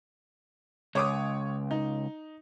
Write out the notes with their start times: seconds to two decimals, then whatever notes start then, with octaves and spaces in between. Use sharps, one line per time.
0.95 C#2 C#5 D6 D#6
1.71 D#4